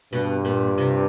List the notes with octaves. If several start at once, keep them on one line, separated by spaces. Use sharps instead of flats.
G2 B2
A#2
C3